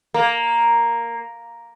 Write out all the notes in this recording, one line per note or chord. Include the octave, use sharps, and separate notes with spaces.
A#3